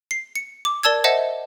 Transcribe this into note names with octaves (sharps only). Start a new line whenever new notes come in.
C7
C#7
D6
A#4 D5 A5 E6 G#6
C5 D#5 E5 F#5 A5